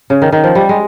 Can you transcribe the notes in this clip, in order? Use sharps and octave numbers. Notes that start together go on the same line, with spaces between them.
C#3
D#3
D#3
F3
G3
G#3